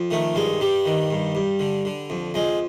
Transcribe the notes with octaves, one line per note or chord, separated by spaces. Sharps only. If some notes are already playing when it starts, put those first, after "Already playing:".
Already playing: F2
D#3 A3
G2 G#3
G2 G3
D#3
G2
G2
D3
D3
F2
F2 G#3